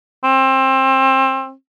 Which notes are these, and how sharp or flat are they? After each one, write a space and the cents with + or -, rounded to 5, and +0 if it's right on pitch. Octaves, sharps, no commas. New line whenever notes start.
C4 +25